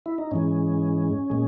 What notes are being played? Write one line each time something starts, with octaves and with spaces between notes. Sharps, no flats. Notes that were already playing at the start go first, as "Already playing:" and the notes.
E4
D#4
G#2 E3 G#3 C#4
A#2 G#3